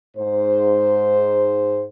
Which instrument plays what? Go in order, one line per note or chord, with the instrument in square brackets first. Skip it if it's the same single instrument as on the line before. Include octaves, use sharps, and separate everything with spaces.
[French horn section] G#2 C5